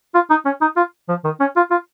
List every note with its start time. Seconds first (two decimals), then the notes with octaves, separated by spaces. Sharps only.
0.14 F4
0.30 D#4
0.45 C#4
0.61 D#4
0.77 F4
1.09 F3
1.25 D#3
1.40 C#4
1.56 F4
1.71 F4